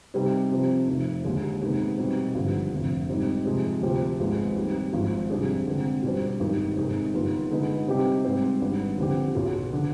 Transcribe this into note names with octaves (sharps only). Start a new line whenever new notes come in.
C3 G3 C4 D#4 G4
C3 F3 C4
F1 F2 D#3
D#2 D3 G#3
C3 D#3 G#3 B3
B2 G3 C4 D#4
G#1 G2 D3 F3
F1 F2 D3
G#2 G3 C4 D#4
C3 F3 G#3
D2 C3 F3 C4 G4
G#1 G#2 F3 G#3 B3
D#2 D#3 G3 C4
G#1 G#2 F3
F2 C3 G3 D4 G#4
D3 G#3 C4
B2 G3 D4 F4 C5
G#1 G2 D#3
C3 D#3 G#3
G1 G2 D#3 B3 F4
D3 G#3 B3 D#4 B4
C3 G3 C4 D#4 G4
G#2 G3 C4 G4 C5
G#1 G#2 G3 B3 D4
D#2 D3 F3 C4 G4
B1 B2 B3 F4 G#4
D3